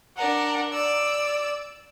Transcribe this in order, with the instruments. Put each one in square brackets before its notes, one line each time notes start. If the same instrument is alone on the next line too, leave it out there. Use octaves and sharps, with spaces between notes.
[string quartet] D4 A#4 [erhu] F#5
[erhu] D5 [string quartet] E6